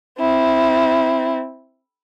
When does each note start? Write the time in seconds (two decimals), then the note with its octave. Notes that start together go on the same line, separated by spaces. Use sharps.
0.19 C4 E4